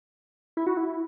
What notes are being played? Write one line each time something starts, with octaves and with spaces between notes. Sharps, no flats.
E4
F#4
E4